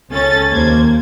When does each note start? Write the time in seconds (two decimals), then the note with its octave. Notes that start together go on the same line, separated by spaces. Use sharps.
0.10 C#2 C#4 A4 A6
0.50 D#2 A#3 C5 G#6